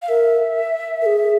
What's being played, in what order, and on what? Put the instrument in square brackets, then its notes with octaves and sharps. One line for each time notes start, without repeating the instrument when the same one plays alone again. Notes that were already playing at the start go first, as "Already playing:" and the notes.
[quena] F5
[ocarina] A#4 [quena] E5
[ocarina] A#4
G#4